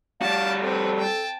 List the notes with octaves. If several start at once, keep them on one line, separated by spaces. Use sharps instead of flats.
G3 F#4 F5 A5 D6
C4 A4 B4
G5 A5